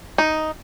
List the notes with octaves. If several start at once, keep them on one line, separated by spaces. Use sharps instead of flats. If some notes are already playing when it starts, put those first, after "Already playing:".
D#4